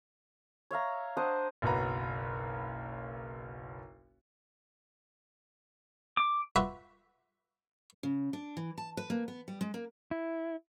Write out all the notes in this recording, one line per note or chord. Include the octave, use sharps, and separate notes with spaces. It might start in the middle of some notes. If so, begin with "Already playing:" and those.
C#5 E5 F5 A#5
D4 C5 D#5 F#5
F#1 B1 F#4 B4 A#5
D6
F4 F#4 B4 E5 C6 D6
C#3
D4
E3
A5
B4
A#3
B3
G3
G#3
A#3
E4